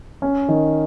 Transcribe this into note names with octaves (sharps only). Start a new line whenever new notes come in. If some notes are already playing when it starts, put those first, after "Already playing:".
C#4
D#3